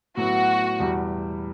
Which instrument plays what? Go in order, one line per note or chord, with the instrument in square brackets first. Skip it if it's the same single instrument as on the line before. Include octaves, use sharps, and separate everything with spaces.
[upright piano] A2 F#3 B3 [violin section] F#4
[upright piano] E2 B2 G3